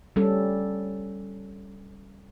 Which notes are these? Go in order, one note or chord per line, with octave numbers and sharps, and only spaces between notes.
G3 C#4 A4